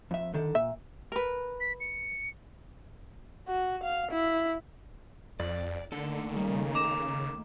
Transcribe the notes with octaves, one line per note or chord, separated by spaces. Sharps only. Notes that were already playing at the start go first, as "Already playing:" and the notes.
F2 E5
D3 D#3 A4
A#2 E5
A#4 B4
B6
C#7
F#4
F5
E4
F2 D5
D3 D#3 A3 A#3 A4
C#3 G3
A#5 D6 E7